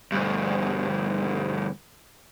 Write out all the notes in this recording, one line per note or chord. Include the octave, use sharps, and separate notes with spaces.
D2 G2